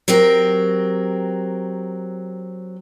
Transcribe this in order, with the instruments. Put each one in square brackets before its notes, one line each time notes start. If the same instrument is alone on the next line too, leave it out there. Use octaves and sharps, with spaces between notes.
[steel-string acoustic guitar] F#3 C4 G4 A#4